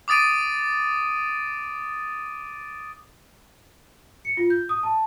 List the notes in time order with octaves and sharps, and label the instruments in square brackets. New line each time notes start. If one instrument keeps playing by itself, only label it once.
[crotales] D6 D#6 A6 D7 D#7
[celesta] C#7
F4
G6
D#6
A5